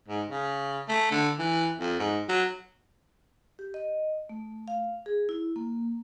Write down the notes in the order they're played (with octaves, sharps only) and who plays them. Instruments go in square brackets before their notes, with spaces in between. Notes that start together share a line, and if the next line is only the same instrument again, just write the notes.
[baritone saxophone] G#2
C#3
A3
D3
E3
F2
G#2
F#3
[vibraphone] G4
D#5
A3
F5
G#4
E4
A#3